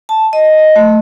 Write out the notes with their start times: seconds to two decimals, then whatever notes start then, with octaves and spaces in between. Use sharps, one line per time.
0.09 A5
0.33 D#5
0.76 A3